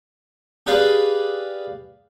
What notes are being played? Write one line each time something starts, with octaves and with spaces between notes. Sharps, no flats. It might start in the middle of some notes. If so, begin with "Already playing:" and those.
G4 G#4 B4 D5 F5 B5